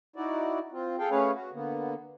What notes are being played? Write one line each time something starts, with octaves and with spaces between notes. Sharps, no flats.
D#4 E4 F#4 D5
C4 F4
G#4 A4 F5 G5
A3 C#4 G#4 B4 C#5 F5
F#4
D3 A#3 B3